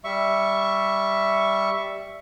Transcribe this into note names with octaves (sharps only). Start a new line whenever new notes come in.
G3 E5 C#6